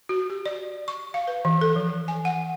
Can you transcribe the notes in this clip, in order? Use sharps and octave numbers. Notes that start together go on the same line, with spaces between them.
F#4
G4
D5
C#6
F5
B4
E3
A4
F3
G#5
F#5